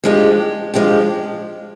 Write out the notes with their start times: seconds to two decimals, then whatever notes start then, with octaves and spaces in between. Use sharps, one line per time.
0.04 F3 G#3 D4 G4
0.74 F3 G#3 D4 G4